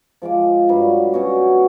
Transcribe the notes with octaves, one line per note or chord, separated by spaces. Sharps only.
F3 G#3 F5 D6
G2 F#3 G3
B2 C#4 F#4